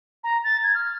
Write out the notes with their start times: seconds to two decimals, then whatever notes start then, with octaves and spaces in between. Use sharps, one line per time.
0.24 A#5
0.44 A6
0.64 G#6
0.75 F6